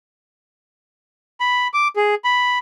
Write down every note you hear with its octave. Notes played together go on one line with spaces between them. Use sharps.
B5
D6
G#4
B5